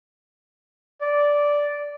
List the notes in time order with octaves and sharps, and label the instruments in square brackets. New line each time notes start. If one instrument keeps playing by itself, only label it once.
[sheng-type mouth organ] D5